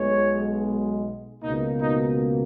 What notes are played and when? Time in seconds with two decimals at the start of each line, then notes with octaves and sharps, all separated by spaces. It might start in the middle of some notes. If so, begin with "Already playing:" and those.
Already playing: B1 B2 G#3 C#5
1.42 C#2 B2 A#3 D#4
1.81 D#4